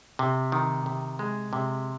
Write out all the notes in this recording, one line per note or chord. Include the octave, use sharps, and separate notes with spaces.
C3
D#3
C3
G#3
C3